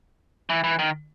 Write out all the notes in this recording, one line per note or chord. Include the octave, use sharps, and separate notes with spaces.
E3
E3
D#3